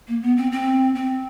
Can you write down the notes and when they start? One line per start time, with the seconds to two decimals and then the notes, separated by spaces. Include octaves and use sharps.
0.08 A#3
0.22 B3
0.37 C4
0.52 C4
0.95 C4